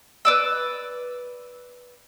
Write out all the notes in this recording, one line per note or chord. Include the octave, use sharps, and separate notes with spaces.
B4 D5 E6